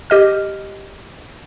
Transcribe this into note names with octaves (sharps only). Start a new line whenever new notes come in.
G4 D#5 F6